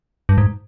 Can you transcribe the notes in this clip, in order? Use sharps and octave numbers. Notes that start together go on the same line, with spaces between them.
G2
G#2